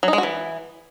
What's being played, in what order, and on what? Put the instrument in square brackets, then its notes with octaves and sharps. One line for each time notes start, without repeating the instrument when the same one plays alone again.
[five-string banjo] F#3
D#4
G#3
F#4
E3